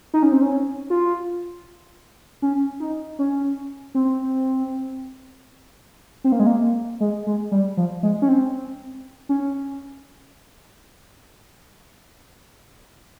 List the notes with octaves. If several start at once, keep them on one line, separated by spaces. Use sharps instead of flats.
D#4
C#4
C4
C#4
F4
C#4
D#4
C#4
C4
C4
A#3
G#3
A#3
G#3
G#3
G3
F3
G#3
C#4
C4
C#4